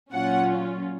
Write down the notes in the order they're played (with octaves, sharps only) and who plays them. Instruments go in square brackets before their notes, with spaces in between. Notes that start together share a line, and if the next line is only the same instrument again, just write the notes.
[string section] A#2 F#3 C#4 F4 F#5